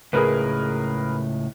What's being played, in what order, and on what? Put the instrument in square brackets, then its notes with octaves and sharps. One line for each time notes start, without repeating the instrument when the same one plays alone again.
[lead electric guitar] C#2 A2 [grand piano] G#4 A#4 B4